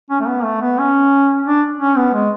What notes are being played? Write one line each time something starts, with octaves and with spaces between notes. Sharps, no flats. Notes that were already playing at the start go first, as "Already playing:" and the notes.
C#4
A3
B3
A3
B3
C#4
D4
C#4
B3
G#3